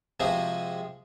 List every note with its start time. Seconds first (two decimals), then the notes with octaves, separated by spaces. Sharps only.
0.20 C3 F3 G#3 C4 F#4 G#4